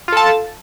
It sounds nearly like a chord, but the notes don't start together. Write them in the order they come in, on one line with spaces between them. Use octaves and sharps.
F4 A4 A5